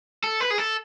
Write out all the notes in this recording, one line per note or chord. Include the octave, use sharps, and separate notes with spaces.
A4
B4
G#4
A4